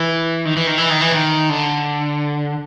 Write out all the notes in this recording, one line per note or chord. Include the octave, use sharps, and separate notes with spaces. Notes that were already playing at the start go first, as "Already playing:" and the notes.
Already playing: E3
D#3
E3
D#3
E3
D#3
E3
D#3
D3